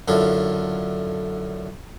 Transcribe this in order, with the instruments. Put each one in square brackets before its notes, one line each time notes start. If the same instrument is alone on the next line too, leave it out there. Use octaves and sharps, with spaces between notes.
[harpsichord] F#2 D3 E4 F4